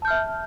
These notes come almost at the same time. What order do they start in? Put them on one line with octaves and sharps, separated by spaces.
A5 G6 F6 E5